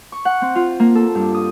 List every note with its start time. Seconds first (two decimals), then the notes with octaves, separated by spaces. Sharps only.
0.12 C#6
0.25 F#5
0.42 C4
0.55 F4
0.80 A#3
0.95 A4
1.15 G2
1.34 D#6